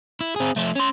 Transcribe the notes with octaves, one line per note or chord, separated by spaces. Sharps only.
E4
C4 G#4
F3 A3
C#4 C6